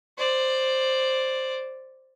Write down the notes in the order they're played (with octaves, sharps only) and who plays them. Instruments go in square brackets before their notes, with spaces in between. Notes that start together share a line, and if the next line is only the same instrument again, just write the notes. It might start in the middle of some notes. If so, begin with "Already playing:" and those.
[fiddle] C5 D5